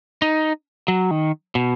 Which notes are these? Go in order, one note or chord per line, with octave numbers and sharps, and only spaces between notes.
D#4
F#3
D#3
B2